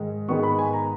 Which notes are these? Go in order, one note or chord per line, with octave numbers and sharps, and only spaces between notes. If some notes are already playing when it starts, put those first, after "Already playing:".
Already playing: G#2 D#3 G#3
G#2 D#3 G#3 B3 C#6
B5
G#5
A#5